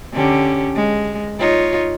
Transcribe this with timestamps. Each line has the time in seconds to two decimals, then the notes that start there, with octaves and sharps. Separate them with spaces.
0.14 D3 C#4 G4
0.75 G#3
1.39 D#4 F4 C#5